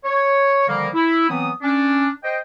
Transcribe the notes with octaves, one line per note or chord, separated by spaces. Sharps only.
C#5
D3 D#3 F3 G3 A#3
E4
E3 F#3 B3 C4 D#6
C#4 D4
C5 D#5 G5